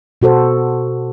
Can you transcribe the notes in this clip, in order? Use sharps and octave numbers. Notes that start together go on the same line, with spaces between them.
B2 F#4 A4 C5